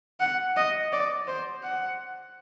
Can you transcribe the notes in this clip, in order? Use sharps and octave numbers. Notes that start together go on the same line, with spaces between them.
F#5
D#5
D5
C5
F#5